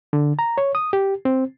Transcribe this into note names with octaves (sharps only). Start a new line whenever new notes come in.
D3
A#5
C#5
D#6
G4
C4